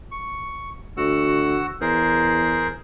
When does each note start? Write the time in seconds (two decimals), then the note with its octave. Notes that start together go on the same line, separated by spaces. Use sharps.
0.11 C#6
0.97 D2 F#4 F#5 E6
1.81 E2 G#4 A#4 C5